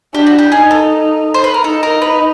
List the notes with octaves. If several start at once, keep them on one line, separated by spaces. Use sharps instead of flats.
D4 G4
F#4
G4
D#4 G#4
A4
C5
B4
A#4
D#4 A4
A#4
B4